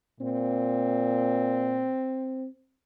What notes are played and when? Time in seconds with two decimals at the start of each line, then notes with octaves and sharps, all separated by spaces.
0.21 A#2 C4